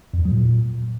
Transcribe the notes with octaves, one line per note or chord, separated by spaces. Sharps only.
F2
E2
F#3
A#2